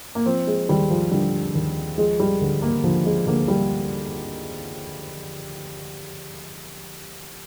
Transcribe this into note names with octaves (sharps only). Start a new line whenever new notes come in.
A#3
F3 C4
G#3
D#2 G3
F3
D3 G3
D#2
F3 G#3
G3
D2
A#3
D3 F3
G#3
D2 A#3
G3